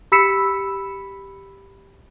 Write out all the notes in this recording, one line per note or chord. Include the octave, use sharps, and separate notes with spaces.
G4 B5 E6 B6 C#7 E7